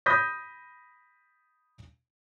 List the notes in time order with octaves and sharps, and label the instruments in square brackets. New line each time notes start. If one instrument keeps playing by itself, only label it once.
[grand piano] B5 D#6 G6 A#6 B6